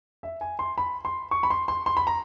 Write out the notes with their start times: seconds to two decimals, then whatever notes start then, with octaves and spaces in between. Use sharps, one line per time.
0.23 E5
0.41 G#5
0.59 C6
0.78 B5
1.05 C6
1.31 C#6
1.43 B5
1.50 C6
1.68 C6
1.86 C6
1.97 B5
2.07 A#5